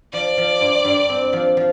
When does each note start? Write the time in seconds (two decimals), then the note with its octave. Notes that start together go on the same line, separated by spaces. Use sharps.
0.13 F3 D5
0.37 F3
0.61 G2
0.84 G2
1.09 C4
1.33 F3
1.57 F3